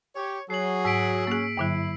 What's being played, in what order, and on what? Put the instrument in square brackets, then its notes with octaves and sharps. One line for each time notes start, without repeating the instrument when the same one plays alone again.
[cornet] G4 [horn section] C#5
[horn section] F#3 [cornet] G#4 [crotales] C7 F#7
[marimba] G#2 [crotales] E6 B6 D7
[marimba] A#3 G#4 [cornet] C#4
[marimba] G2 D3 F#3 [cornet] E4